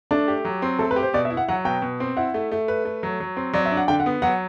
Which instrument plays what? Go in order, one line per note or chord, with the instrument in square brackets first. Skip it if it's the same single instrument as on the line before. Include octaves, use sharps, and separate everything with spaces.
[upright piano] A3 [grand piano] D4
[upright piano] G4
F#3
C4
[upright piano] A3 [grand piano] A4
[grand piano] B4
[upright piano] G4
[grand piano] C5
[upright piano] B2 [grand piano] D5
[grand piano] E5
[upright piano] E4
[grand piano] F#5
[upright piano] F#3 [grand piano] F#5
[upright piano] B2 [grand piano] G5
[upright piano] B2
C4
[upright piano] E4 [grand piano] F#5
[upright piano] A3
A3
B4
A3
F#3
F#3
C4
[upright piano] F#3 [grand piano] D5
[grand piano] E5
[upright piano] D4
[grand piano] F#5
[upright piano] D3 [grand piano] G5
[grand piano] F#5
[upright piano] B3
[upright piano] F#3 [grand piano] F#5